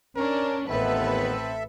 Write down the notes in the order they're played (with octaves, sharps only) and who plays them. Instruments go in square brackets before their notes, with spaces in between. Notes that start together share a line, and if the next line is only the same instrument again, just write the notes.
[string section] C#4 D4 [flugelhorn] A#4
[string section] A1 B4 [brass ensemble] D#2 B3 [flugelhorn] C4 [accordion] A4 E5